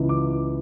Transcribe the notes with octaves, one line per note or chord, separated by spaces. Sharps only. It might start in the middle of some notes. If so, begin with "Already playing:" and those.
Already playing: C#2 C#3 E3
D6